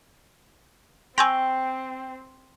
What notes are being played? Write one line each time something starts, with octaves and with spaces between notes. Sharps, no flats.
C4 G5 G#5 C6 C#6 E6 G6 A#6